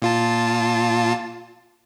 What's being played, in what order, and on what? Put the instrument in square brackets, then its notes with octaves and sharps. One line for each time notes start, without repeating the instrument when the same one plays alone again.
[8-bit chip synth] A#2 F4 A5